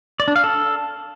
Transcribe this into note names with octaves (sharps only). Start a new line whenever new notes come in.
D5
D4
F5
A4